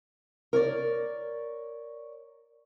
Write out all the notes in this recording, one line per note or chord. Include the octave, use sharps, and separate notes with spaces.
A#4 C#5 D5